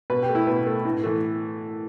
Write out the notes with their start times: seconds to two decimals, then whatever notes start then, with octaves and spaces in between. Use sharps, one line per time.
0.10 B2 B4
0.23 G4
0.29 A3
0.35 E4
0.47 B2 B4
0.66 A3
0.85 A2
1.03 E3 A3